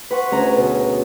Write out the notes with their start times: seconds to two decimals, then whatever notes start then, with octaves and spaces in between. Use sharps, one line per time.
0.10 B4 F#5 C6 C#6
0.31 D2 C#4 G#4 A#5
0.57 B2